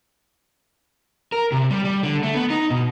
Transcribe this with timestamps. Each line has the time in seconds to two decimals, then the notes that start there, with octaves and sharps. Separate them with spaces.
1.32 A#4
1.52 C3
1.71 G3
1.84 G3
2.03 D3
2.23 A3
2.35 B3
2.50 D#4
2.70 B2